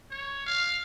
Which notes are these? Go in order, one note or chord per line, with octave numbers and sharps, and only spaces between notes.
C#5
F5